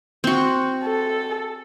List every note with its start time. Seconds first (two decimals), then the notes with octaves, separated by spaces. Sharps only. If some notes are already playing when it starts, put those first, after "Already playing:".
0.24 C4 F#4
0.84 A4